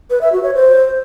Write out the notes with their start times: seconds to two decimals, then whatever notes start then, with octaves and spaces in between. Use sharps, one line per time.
0.10 B4
0.21 E5
0.32 F#4
0.43 C#5
0.54 C5